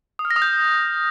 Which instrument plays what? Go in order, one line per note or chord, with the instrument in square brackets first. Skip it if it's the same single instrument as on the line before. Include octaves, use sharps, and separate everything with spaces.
[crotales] D#6
F6
A#6
D#6
G6